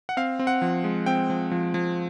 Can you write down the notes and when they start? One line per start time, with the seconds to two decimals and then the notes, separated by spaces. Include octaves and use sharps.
0.09 F#5
0.17 C4 F5
0.39 C4
0.47 F#5
0.62 F3
0.84 G#3
1.06 C4 G5
1.30 F3
1.51 F3
1.74 F3